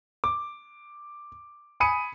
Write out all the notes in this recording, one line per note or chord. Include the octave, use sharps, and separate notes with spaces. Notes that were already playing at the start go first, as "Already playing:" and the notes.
D6
G#5 B5 D#6 C#7 D#7